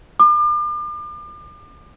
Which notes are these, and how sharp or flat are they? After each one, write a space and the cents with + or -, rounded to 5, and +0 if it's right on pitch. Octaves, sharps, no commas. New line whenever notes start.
D6 +40